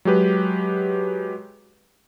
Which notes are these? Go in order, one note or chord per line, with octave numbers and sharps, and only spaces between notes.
F#3 G#3 G4 B4